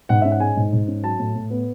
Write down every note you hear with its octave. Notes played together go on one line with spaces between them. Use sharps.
G#2 F#5
C#4 E5
F#5
G#3 G#5
G#2
G#2
C#4
F#3 A5
A2
A2
B3